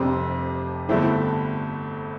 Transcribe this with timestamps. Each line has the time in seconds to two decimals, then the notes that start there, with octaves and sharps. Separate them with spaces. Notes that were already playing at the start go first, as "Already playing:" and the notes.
Already playing: F1 F2 C3 G3 C4 D4
0.89 G1 G2 D3 A3 C4 E4